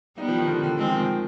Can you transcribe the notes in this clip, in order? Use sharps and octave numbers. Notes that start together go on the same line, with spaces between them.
G3 B3 D#4
F3
D#3
D3
D3
D#3 G#3 C4
F3
D#3